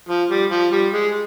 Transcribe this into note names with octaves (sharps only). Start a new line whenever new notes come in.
F3
G3
F3
G3
G#3